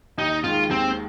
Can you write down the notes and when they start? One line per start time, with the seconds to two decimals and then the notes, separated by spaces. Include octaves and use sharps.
0.18 D#2 D#4
0.44 D#3 G#3 F4
0.70 D#2 C4